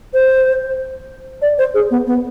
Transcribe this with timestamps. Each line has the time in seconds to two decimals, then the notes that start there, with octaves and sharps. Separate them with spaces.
0.14 C5
1.42 D5
1.58 C5
1.74 G#4
1.91 B3
2.07 B3